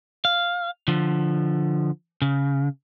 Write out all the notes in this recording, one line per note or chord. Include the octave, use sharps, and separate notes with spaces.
F5
D3 F3
C#3